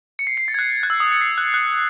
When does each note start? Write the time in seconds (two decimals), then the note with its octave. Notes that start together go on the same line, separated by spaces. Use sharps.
0.19 C#7
0.27 C7
0.37 C7
0.48 A6
0.54 G#6
0.59 F#6
0.83 F#6
0.90 E6
1.00 D#6
1.12 C#7
1.21 C7
1.38 F#6
1.54 F#6